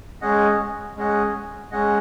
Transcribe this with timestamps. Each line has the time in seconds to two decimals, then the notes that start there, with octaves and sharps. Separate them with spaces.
0.22 G#3 C#4 G#4 D#5 F#5
0.97 G#3 C#4 G#4 D#5 F#5
1.71 G#3 C#4 G#4 D#5 F#5